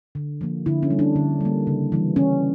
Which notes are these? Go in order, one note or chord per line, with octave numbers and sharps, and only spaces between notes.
D3
F3 A#3
D3 E4
C#4
G3 A#3
D4
D3
G3 A#3
C#3
E3 G3
E3 C#4